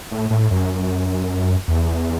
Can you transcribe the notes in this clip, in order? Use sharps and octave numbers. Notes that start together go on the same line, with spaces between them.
A2
A2
F#2
E2